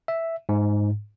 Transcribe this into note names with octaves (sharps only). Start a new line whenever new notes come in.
E5
G#2